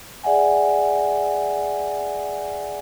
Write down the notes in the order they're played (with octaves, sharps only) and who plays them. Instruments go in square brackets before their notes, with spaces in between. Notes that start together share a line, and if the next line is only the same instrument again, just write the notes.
[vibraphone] G#4 D5 E5 F#5 G#5